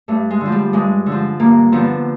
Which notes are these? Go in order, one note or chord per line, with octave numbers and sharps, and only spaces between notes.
G2 A3
G#3
D3 F3
G3
G2 G#3
D3
F3
G2 A#3
D3 F3 B3